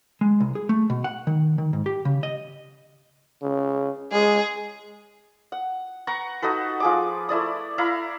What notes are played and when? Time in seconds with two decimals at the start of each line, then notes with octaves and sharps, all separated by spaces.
0.21 G#3
0.40 C2
0.55 G#4
0.69 A3
0.90 B2
1.04 F#5
1.27 D#3
1.58 D#3
1.73 G#2
1.86 G4
2.05 C#3
2.23 D#5
3.42 C#3
4.12 G#3 G#4
5.52 F#5
6.07 B4 F#5 A#5 C#6
6.42 D#4 F#4 A4 B4
6.80 F3 G#4 D6
7.29 A3 E4 D5 D#6
7.78 E4 F5 A#5 B5